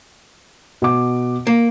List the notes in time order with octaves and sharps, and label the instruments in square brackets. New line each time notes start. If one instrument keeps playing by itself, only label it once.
[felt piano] B2 D6
[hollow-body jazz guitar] A#3